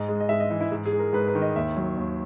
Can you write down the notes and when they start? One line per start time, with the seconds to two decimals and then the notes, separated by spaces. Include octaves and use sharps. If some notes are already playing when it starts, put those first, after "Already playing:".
Already playing: G#2 D#5
0.08 G#3
0.20 D#5
0.29 G#2 E5
0.40 D#5
0.51 E3 E4
0.61 E4
0.72 G#2
0.86 G#4
0.92 G#3
0.99 A#4
1.13 G#2 B4
1.28 B4
1.35 D#3
1.42 D#5
1.56 D#2 E5
1.77 F#3
1.97 D#2